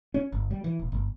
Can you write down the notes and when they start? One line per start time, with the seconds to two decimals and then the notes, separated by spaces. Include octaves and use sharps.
0.14 C#4
0.32 G1
0.51 G3
0.64 E3
0.79 D#1
0.92 G1